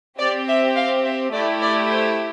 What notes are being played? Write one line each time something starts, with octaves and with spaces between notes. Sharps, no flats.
C4 G4 D5
E5
F5
E5
A3 E4 G4 D5
D5
C5